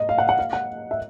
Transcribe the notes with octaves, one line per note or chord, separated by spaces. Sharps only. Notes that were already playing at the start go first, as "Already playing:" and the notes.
Already playing: D#5
F5
F#5
F#5
F5
F#5
E5